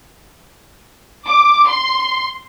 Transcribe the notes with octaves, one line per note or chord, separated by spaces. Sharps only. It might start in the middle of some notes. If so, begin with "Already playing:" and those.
D6
C6